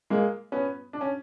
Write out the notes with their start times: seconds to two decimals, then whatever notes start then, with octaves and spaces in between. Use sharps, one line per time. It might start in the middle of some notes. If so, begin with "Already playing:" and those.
0.10 G#3 A#3
0.52 B3 C#4
0.93 D4
1.01 C#4